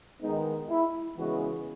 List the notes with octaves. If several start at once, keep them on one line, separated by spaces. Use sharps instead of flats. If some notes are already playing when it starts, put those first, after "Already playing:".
D#3 G#3 B3 D#4
E4
C#3 E3 G#3 B3 F#4